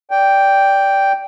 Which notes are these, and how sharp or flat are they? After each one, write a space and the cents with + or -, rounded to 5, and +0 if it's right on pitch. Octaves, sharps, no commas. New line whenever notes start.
D5 -15 G5 +0